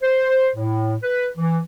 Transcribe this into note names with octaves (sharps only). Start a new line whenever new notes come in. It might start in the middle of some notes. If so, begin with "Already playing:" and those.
C5
A2
B4
E3